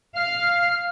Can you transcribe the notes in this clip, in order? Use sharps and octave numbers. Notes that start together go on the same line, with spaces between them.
F5 F6